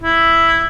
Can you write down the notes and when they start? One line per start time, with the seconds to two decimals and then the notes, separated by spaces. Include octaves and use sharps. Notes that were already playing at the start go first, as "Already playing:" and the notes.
0.03 E4